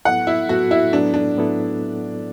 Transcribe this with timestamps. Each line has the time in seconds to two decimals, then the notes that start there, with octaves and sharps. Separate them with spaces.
0.05 A2 F#3 B3 E4 A4 F#5
0.27 E4
0.49 A2 F#3 B3 E4 F#4 A4
0.71 E4
0.93 A2 F#3 B3 D4 E4 A4
1.14 D4
1.35 A2 F#3 B3 E4 A4